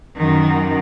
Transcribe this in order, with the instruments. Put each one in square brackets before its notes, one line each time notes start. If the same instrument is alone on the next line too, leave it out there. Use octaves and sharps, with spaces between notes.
[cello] F#2 D#3